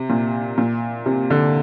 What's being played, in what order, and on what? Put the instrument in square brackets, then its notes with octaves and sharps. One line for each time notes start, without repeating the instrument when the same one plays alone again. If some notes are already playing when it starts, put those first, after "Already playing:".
Already playing: [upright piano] C3
A#2
A#2
C3
D3